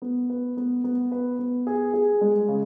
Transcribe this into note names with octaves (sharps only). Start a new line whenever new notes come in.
B3
B4
B3
B3
B4
B3
G#4
G#4
G#3
C#3